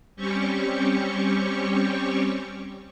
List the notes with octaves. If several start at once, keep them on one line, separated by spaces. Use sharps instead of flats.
G3 C4 C#4 G4 C#6